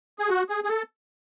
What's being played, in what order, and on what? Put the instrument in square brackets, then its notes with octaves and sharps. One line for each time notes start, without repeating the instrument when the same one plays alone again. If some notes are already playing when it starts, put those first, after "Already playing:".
[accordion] G#4
F#4
G#4
G#4
A4